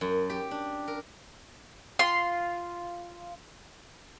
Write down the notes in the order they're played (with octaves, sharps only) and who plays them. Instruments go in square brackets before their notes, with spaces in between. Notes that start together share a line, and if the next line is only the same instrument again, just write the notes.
[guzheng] F#2
G4
D4
A#4
[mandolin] F4 C6